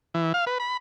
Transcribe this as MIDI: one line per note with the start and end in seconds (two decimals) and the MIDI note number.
0.14 0.33 52
0.34 0.45 77
0.47 0.58 71
0.60 0.77 83